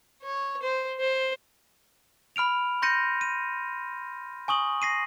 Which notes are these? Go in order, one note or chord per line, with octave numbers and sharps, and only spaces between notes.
C#5
C5
C5
B5 F6 D7 F7
C6 G6 A#6 C#7 D#7
D#7
G#5 C#6 D#6 F#7
A#6 C7 D#7